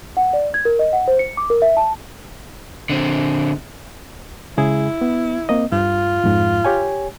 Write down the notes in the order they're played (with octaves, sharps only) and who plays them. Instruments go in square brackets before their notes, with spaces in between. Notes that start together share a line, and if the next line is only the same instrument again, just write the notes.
[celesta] F#5
D5
G#6
A#4
D#5
F#5
C5
C#7
D6
A#4
E5
A5
[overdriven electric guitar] D3 C4
[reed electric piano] C#3 G#3 G#4 [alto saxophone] E4
[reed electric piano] B3
A#3 C4 D#5
[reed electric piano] G2 [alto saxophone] F4
[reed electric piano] F2 G#2
G4 C#5 G#5